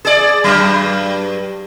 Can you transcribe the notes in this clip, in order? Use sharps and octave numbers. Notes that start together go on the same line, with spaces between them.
G#4 D5
G2 F#3